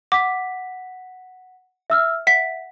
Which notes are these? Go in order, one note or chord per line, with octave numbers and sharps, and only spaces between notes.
F#5 D6 B6
E5 E6 F6
E5 F#5 B6